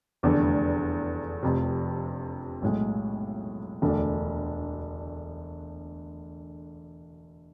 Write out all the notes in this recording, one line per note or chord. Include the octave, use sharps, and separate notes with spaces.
F1 E2 D3 A3 D4
F1 F2 C3
B1 A2 G#3
E1 D2 D3 A3 D4